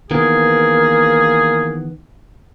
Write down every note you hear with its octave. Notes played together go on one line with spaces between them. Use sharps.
D#3 E3 A#3 B3 G#4